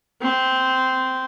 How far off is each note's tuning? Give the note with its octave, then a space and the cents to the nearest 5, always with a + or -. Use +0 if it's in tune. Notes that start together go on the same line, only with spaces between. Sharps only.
C4 -10